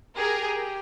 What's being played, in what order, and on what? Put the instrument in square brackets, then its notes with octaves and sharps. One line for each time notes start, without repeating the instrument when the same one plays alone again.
[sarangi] G4 [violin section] G#4 A#4